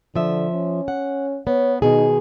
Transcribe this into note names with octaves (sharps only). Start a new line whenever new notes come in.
D3 F3 E5
C#4
F#5
B3 C#5
B2 D#3 D#4 G#4